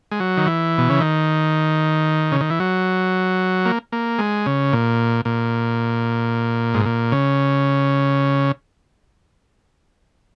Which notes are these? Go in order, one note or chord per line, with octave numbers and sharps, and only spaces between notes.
G#3
F#3
D#3
E3
B2
C#3
D#3
C#3
D#3
E3
F#3
A#3
A#3
G#3
C#3
A#2
A#2
G#2
A#2
C#3